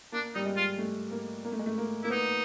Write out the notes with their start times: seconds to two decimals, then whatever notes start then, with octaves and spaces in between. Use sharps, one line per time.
0.12 A#3 D4
0.35 G3 D#4
0.45 G#3
0.57 F4
0.78 A3
1.11 A#3
1.45 A#3
1.52 A3
1.59 G#3
1.66 A3
1.78 A#3
2.03 A#3 E4
2.10 B3 D#4